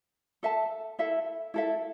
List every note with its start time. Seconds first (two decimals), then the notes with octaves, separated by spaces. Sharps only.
0.43 A4 E5 A5
0.99 E4 A4 E5
1.54 E4 A4 E5